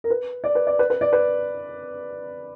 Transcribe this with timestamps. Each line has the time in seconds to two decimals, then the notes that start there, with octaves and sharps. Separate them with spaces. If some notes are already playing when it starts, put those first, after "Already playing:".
0.04 A#4
0.10 B4
0.44 D5
0.55 B4
0.67 D5
0.79 B4
0.90 B4
1.01 D5
1.13 B4